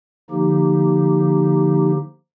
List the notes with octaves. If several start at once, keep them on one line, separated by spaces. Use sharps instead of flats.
D3 F3 A#3 D#4 G4